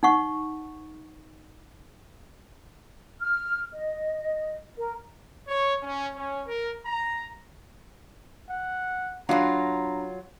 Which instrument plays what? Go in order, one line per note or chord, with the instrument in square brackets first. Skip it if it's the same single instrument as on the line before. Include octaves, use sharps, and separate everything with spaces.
[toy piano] D#4 F#5 C#6
[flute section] F6
D#5
A#4
[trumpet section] C#5
C#4
C#4
A#4
A#5
[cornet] F#5
[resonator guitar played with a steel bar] F#3 F4 [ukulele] D4 D#5 B5 [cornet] A#5